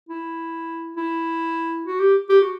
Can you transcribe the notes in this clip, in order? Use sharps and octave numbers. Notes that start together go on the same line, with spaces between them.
E4
E4
F#4
G4
G4
F#4